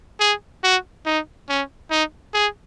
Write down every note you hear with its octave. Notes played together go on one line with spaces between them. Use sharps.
G#4
F#4
D#4
C#4
D#4
G#4